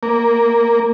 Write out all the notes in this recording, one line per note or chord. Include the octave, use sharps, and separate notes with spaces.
A#3